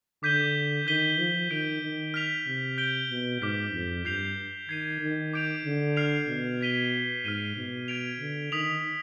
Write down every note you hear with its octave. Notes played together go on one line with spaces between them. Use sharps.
D3 D6 G6 B6 D#7 G7
D#3 G6 B6 D#7 G7
F3
D#3 G6 D7 F7
D#3
F6 B6 F7
C3
G6 D7 G7
B2
G#2 D6 F6 B6
F2
G2 G6 C7 F7
D#3 G#6 C7 D#7
D#3
D6 G6 D7 F7
D3
F6 C7 F7
B2
G#6 B6 D#7 G7
G#2 F6 C7 D#7 G7
B2
G#6 D7 F7
D3
D#3 D#6 B6 F7